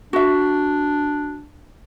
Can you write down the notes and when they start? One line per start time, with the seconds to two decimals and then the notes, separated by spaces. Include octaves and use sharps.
0.13 D4 F#4 E5